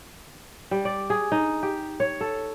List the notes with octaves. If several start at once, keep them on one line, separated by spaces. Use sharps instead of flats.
G3
D5
G#4
D#4
G4
C#5
A4